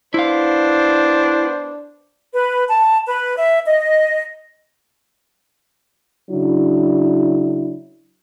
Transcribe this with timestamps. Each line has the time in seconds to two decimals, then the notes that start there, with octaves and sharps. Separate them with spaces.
0.14 B3 D4 E4 C5 F5
2.33 B4
2.68 A5
3.07 B4
3.37 E5
3.66 D#5
6.30 C#3 F#3 D4 E4